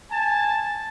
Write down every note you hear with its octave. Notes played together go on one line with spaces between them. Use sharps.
G#5 A5